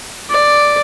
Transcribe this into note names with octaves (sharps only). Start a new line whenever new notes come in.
D5